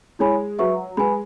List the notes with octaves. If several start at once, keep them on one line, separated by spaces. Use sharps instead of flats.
G#3 E4 C#5 G#5 B5
F#3 F#4 B4 E5 C#6
G#3 B4 G#5 B5